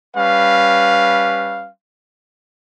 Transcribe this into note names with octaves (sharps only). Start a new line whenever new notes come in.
G3 C#4 B4 F5